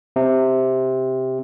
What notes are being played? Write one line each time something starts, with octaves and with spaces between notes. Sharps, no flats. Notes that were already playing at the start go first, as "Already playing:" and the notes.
C3